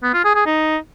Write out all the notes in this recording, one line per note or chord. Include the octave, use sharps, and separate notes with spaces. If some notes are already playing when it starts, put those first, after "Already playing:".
B3
F4
G#4
G#4
D#4